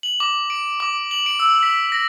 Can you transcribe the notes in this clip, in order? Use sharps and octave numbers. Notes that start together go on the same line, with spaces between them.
F#7
D6
D7
D6
F#7
D7
E6
B6
A#6